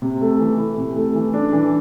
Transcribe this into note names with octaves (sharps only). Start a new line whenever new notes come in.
C3
A3
E3
E4
C3
A3
E3
D4
E3